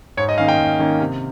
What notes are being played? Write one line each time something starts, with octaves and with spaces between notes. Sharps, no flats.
G#2 C#5
D#5
D#3 A#3 C#4 F5
G5
G#2
D#3 A#3 C#4
C3